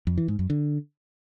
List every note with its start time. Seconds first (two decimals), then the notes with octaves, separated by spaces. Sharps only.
0.07 F2
0.18 E3
0.28 G#2
0.39 F#2
0.50 D3